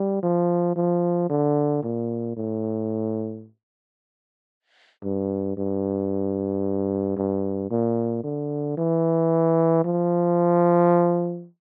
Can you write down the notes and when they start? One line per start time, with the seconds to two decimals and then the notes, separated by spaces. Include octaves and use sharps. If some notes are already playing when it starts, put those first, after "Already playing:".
Already playing: G3
0.23 F3
0.76 F3
1.30 D3
1.83 A#2
2.37 A2
5.03 G2
5.57 G2
7.17 G2
7.71 A#2
8.24 D3
8.78 E3
9.85 F3